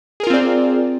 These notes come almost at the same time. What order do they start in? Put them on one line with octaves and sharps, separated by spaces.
G#4 A#4 F4 C4 D5